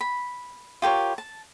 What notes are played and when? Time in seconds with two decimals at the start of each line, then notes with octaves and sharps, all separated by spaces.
0.01 B5
0.82 F4 G4 A#4 C#5
1.18 A5